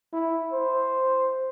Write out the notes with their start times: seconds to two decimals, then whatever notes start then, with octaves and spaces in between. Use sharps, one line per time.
0.13 E4
0.52 C5